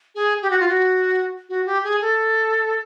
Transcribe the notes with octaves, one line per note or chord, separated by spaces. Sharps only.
G#4
G4
F#4
F4
F#4
F#4
G4
G#4
A4